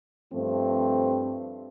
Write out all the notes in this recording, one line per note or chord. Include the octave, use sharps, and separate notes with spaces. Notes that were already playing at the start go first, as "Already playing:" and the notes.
G2 F3 A3 C4